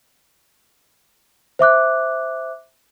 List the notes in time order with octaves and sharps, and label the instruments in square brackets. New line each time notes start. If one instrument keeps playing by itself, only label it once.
[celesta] C5 E5 D6 F#6